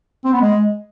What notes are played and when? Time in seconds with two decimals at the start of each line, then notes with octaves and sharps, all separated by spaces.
0.24 C4
0.33 B3
0.41 G#3